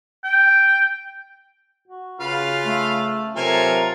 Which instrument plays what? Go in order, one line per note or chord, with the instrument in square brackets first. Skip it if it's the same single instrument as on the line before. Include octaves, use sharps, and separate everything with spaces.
[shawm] G5
[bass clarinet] F#4
[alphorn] C#3 [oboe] F4 [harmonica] B4 F5
[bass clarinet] A3
[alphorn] C3 [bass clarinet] F#3 [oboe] F4 [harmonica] A4 A#4 G#5